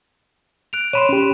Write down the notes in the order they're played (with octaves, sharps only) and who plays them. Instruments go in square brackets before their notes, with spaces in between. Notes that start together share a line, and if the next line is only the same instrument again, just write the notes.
[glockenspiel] F#6 D7 F7
[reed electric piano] C#5 B5 C6 [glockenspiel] D#7 E7
[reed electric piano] C#4 G4